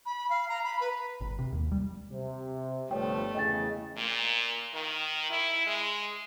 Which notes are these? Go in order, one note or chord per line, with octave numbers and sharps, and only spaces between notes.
B5
F5
A#5
B5
B4
G#1
C3
D#2
G3
C3
G1 G2 F3 A3 C#5 G5
E2 C#3 D#5 G5 A6
A#2
D#3
E4
G#3